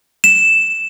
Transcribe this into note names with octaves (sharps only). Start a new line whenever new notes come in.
E7